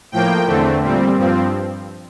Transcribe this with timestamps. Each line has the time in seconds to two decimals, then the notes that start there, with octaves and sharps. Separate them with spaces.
0.12 A2 F3 A#3 G5
0.46 E2 D3 A3 C4
0.82 A#2 G3 C4
1.16 G2 F3 C4